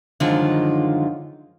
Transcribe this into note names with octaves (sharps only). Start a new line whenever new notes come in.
F#2 D3 D#3 F3 G#3 F4